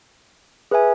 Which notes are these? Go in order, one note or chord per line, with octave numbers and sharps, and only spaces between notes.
G#4 B4 E5 G#5